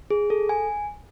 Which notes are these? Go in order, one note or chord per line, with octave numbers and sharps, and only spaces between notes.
G#4
A4
G#5